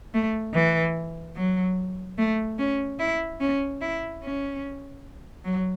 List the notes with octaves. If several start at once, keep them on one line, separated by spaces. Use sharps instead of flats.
A3
E3
F#3
A3
C#4
E4
C#4
E4
C#4
F#3